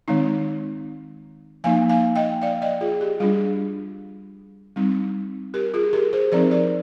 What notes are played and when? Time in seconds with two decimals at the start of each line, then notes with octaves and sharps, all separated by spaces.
0.08 D#3 G#3 C4 D#4
1.64 F3 A#3 D#4 F5 G#5
1.90 F5 G#5
2.16 D#5 G5
2.42 D5 F5
2.62 D#5 G5
2.81 F4 G#4
3.01 G4
3.20 G3 D4 F4 G#4
4.76 G3 C4 D#4
5.54 G4 A#4
5.74 F4 G#4
5.93 G4 A#4
6.13 G#4 C5
6.32 F3 C4 D#4 A#4 D5
6.51 A#4 D5